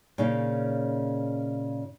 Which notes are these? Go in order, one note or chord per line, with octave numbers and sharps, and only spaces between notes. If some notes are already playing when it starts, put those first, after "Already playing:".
A#2 C#3 C#4 D#4